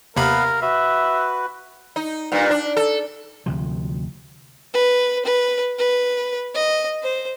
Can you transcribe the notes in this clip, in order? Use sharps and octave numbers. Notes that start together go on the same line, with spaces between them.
D#2 C3 B3 A#4 B4 F5 B5
F#4 B4 E5
D#4
G2 A#2
D4
A4
D2 C3 F3
B4
B4
B4
D#5
C5